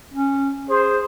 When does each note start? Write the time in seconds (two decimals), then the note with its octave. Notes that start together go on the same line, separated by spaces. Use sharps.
0.13 C#4
0.69 G#4 C5